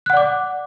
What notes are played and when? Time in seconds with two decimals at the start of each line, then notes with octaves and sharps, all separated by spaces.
0.06 F#6
0.10 F#5
0.13 D5
0.17 D6